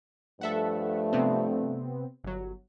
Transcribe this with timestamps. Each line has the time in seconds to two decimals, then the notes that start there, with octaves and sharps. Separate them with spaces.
0.41 G2 F3 A3 A4 E5 F#5
1.13 C3 B3 C4
2.24 G1 F#3